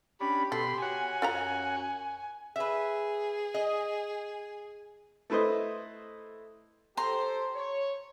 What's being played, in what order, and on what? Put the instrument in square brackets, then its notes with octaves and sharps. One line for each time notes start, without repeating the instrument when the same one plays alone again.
[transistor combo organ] C#4 D4 [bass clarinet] G4 [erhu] B5
[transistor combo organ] B2 B5 [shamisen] A4 [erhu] C6
[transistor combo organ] F#4 C#5 F#5 [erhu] G#5
[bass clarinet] F#2 [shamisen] F4 G4 A#5
[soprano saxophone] G#4 [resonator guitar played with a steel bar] B4 E5
[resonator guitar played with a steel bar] D#5
[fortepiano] A3 E4 B4 C5 D#5
[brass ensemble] G4 A4 C5 [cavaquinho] A#5 C6
[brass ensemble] C#5